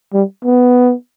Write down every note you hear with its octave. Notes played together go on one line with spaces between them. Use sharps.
G3
B3